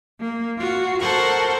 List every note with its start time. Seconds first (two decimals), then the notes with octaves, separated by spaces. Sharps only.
0.20 A#3
0.57 F4 F#4
1.01 A4 A#4 C5 F#5 C#6